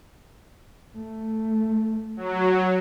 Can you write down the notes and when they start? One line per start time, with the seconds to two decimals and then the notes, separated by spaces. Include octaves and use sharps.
0.97 A3
2.17 F#3